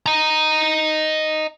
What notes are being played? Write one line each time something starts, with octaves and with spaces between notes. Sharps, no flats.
D#5 A#5